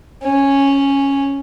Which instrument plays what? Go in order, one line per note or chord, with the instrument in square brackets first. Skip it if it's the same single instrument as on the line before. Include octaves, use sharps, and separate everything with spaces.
[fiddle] C#4